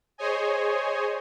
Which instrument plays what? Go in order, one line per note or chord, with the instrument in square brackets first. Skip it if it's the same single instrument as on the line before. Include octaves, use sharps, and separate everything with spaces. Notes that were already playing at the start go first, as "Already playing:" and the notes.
[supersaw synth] G#4 C5 C#5 D#5 G#5